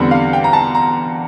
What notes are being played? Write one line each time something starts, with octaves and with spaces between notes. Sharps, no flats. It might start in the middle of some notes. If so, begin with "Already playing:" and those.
Already playing: E2 D3 G3 C4
F5
G5
A#5
A5
A#5